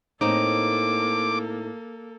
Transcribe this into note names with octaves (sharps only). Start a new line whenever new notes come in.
A2 A#3 C4 D#4 A4 D6